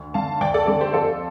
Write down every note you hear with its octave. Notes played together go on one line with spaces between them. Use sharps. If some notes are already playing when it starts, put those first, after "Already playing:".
Already playing: D2
D3 F5 A5
D2 D5 G5
A4 D5
D3 A4 D5
G4 C5
F2 F4 A4